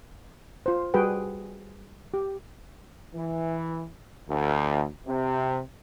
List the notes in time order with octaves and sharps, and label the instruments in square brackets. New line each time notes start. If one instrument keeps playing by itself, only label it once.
[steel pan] F4 C5
G3 F#4 G#4 B4 G5
G4
[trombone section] E3
D2
C3